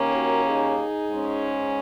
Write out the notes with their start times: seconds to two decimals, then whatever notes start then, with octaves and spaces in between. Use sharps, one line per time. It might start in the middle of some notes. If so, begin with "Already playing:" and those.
Already playing: D#2 D#3 A#3 C#4
0.14 F#4 A#4
0.46 D#4 G#4
1.08 G#2 G#3 C#4